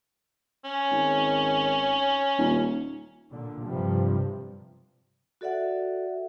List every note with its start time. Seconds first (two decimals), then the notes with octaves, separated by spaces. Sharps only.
0.65 C#4
0.91 G#1
2.38 D#1
3.31 A#2 D3
3.64 G2 C3 F3 G3
5.41 F#4 A4 D5 E5 F#5